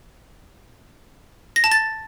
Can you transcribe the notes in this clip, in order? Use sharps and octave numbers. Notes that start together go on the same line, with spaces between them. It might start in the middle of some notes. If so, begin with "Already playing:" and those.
A#6
A5
A6